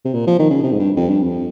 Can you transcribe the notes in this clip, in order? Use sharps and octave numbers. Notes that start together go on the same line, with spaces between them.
C3
A#2
F3
D#3
C#3
C3
G#2
G2
F2
G2
F2